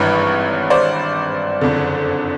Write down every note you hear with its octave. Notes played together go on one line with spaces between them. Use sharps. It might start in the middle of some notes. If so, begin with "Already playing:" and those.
Already playing: G#1 G2 E3 B4 C#5
C5 D5
F#1 F2 D3